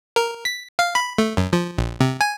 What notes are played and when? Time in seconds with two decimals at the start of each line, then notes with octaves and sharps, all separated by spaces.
0.16 A#4
0.45 B6
0.79 F5
0.95 B5
1.18 A3
1.37 F#2
1.53 F3
1.78 A#1
2.00 C3
2.21 G#5